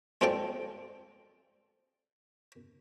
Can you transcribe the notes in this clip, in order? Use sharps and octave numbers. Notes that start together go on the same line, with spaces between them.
G#3 C4 F4 A4 D5 G5